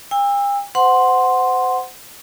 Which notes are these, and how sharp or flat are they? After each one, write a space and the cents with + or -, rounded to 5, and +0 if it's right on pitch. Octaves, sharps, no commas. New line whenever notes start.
G5 +45 E6 +0
C5 -30 F#5 +0 C6 +0